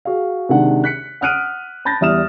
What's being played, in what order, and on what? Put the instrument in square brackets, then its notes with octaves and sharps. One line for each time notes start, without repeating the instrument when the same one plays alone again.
[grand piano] F#4 G#4 F5
C3 D#3 G#3 D4 F#5
F#6 B6 C#7
F#5 D#6 F6 F#6 D7 D#7
A5 B5 G6 A6 A#6
E2 G3 E5 D#6 F6 E7